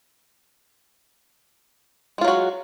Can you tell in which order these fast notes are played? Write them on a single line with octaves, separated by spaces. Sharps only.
G#3 F4 F#3 F#4